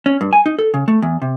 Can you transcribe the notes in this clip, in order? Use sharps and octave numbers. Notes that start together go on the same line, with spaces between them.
C#4
G2
G#5
D#4
A4
C#3
A3
E2
C3